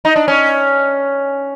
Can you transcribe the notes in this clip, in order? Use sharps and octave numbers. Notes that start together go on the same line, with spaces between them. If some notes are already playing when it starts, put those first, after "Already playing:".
D#4
D4
C#4